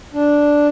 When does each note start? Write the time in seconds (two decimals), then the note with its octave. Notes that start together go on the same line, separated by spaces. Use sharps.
0.14 D4